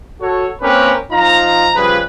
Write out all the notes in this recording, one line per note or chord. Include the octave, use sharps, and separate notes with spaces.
F#4 A4 C#5
A#3 C4 C#4 G4 A#4 B4
F3 D#4 F4 A#5
C#3 F3 G3 G#4 B4